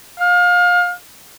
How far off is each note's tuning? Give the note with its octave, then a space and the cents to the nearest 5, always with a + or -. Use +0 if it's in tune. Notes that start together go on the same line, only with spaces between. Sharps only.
F5 +30